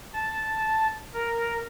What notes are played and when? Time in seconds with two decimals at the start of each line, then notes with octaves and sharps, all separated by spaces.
0.13 A5
1.14 A#4